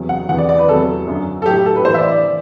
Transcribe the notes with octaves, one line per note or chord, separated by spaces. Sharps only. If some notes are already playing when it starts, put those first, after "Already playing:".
Already playing: E2 C3 F#3
F#5
E2 C3 E3 F#5
D5
D5
B4
E2 C3 F#3 A4
F#2 D3 F#3
A4
A2 F#3 G4
G4
A4
B4
A2 E3 C5
E5
D5
D5
E3